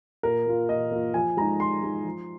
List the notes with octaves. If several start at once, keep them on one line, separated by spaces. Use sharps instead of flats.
A#2 A#4
A#3 F4
A#2 D#5
A#3 F4
F3 G#5
G#3 D#4 A#5
F3 C6
G#3 D#4
F3